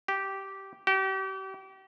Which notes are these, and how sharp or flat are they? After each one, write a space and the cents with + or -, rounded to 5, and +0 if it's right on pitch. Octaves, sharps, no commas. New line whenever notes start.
G4 -10
G4 -35